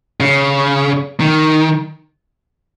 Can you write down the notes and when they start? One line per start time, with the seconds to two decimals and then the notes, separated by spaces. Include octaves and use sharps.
0.20 C#3
1.20 D#3